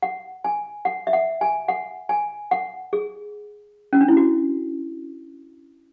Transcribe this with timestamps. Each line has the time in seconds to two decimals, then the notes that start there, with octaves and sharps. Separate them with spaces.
0.02 F#5
0.44 G#5
0.85 F#5
1.07 E5
1.13 F#5
1.41 G#5
1.68 F#5
2.09 G#5
2.51 F#5
2.93 G#4
3.93 C#4
4.01 D4
4.08 E4
4.17 F#4